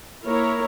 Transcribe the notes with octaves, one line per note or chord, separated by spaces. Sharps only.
A#3 E4 A#4 C#5